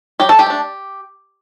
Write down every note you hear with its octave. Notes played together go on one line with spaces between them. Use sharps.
F#3 G4
A4
G4
A3 D4